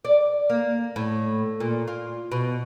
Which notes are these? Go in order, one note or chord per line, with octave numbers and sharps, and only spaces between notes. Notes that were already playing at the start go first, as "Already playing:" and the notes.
D5
A#3
A2
A#2
F4
B2